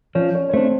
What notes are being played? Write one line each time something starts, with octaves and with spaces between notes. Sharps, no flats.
F3 C#4 C#5
C#4 C#5
C#5
A3 C4 D4 C5